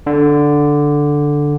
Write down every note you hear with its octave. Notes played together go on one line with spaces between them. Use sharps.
D3